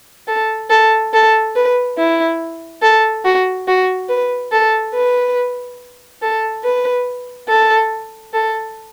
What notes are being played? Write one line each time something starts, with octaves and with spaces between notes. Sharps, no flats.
A4
A4
A4
B4
E4
A4
F#4
F#4
B4
A4
B4
A4
B4
A4
A4